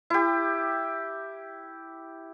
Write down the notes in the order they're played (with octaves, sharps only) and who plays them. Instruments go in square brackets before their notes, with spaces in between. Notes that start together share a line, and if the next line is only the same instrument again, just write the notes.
[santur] E4 G4